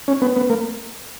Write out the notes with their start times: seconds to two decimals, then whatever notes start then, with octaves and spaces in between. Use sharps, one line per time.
0.08 C#4
0.22 B3
0.36 B3
0.50 A#3